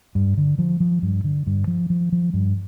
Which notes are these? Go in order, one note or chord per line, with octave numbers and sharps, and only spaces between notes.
G2
D3
F3
F3
G2
D3
G2
F3
F3
F3
G2